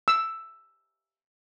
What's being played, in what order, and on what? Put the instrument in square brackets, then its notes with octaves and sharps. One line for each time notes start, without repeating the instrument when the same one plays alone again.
[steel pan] E6